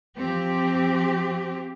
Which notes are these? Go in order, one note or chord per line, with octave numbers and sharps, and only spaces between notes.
F3 C4 G4